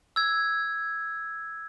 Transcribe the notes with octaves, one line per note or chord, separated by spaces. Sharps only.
E6 G#6